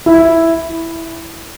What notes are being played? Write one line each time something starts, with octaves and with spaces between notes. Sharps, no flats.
E4